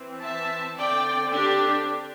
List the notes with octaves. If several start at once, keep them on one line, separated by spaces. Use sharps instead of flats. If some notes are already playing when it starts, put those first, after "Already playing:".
Already playing: E3 C4
E5 A5
D3 C4 D5 G5
D4 G4